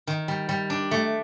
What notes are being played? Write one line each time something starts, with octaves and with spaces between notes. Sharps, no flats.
D#3
G3
G3
D4
A3